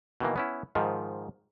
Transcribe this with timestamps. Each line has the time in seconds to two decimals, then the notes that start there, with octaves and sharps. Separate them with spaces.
0.20 B2 D#3 E3 A#3
0.36 B3 C#4 E4
0.75 G#2 D#3 F3